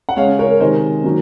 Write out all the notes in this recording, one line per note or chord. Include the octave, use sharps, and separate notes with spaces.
F#5
C#3 G#3 C#5 F5
A#4 C#5
C3 D#3 G#3 C5 D#5
D#3 F#3 A#3